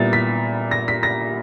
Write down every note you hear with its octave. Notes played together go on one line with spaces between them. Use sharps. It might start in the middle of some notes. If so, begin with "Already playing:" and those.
Already playing: A#2 G3 B3 E4 A6
B6
A#6
B6
A#6